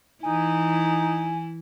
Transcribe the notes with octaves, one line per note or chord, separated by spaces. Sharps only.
E3 D#4 E4 G#5